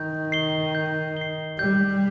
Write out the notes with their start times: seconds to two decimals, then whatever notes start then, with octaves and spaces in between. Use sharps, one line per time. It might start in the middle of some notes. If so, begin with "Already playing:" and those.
Already playing: D#3 G6
0.32 C7 G7
0.75 G6
1.17 C7 G7
1.59 G3 G6